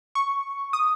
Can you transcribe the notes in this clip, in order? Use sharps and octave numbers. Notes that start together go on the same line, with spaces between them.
C#6
D#6